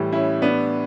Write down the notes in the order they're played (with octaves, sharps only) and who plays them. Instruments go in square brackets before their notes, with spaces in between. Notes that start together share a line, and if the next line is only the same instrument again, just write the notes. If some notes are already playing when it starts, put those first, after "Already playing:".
Already playing: [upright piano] A2 E3 G3
C#4 E4
B3 D4